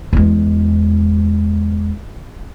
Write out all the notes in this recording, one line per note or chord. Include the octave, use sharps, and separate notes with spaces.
E2 G#3